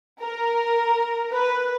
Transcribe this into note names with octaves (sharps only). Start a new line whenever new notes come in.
A#4
B4